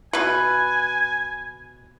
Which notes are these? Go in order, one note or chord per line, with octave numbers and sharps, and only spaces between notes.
B2 B4 G#5